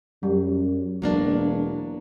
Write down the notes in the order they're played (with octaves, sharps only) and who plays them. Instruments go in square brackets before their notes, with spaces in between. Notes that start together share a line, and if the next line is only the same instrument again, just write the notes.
[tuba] F#2 [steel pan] G3
[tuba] E1 [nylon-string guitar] F#3 A#3 D4